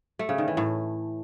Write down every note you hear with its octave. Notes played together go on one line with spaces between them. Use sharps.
A3
C#3
D#3
E3
A2